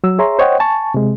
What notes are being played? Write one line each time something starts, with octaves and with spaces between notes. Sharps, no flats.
F#3 E6
G#4 C#5 E5 A#5 C6
C5 C#5 D#5 F#5 G5
G#5 A5 C#6
C3 G#3